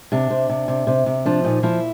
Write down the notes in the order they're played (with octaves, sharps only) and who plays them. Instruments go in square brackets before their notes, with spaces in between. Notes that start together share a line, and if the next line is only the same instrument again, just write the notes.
[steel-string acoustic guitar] C3 D4
C3
C3
C3
C3
C3
F3 D4
A#2 D#4
F3 E4